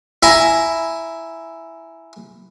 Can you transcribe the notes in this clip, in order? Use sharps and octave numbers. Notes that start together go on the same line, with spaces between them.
E4 G#5 A#5